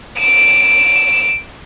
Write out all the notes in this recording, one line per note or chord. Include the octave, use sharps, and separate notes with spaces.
D7 E7